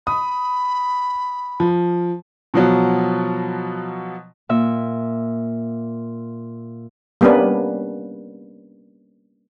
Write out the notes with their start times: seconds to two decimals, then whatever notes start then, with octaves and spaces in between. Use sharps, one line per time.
0.07 B5 D#6
1.60 F3
2.54 B2 F3 F#3
4.49 A#2 E5
7.21 G3 A#3 B3 C#4 D4 B4